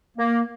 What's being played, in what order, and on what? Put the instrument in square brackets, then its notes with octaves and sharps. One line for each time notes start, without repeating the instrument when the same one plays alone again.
[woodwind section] A#3